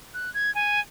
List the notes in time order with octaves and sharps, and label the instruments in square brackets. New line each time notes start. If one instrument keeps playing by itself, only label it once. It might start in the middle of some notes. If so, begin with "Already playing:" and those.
[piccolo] F#6
G#6
G#5